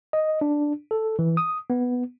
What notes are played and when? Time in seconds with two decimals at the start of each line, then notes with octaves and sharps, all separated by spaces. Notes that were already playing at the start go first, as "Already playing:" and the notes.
0.13 D#5
0.41 D4
0.91 A4
1.19 E3
1.37 D#6
1.70 B3